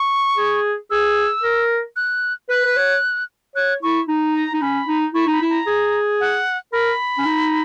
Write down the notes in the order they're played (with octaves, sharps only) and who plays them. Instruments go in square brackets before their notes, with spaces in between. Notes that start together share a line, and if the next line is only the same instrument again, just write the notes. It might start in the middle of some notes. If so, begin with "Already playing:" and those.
Already playing: [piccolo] C#6
[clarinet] G#4
[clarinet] G#4 [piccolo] E6
[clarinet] A#4
[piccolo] F#6
[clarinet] B4 [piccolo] F#6
[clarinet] B4
C#5
[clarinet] C#5 [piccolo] F#6
[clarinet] E4 [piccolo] C#6
[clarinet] D#4
[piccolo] A#5
[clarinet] D#4
[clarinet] C#4 [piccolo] B5
[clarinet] D#4
[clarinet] E4 [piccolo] C#6
[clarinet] D#4 [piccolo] B5
[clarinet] E4
[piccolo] A#5
[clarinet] G#4
[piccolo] F#5
[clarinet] A#4 [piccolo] B5
[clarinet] C#4
D#4